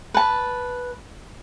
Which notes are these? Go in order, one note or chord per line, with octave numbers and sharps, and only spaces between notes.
B4 A5